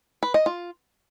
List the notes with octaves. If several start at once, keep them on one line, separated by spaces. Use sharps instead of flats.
B4
D#5
F4